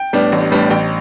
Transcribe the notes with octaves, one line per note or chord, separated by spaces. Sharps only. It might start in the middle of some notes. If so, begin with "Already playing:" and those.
Already playing: G5
A2 G3 B3 D4
A1
A2 G3 B3 D4
A1 G5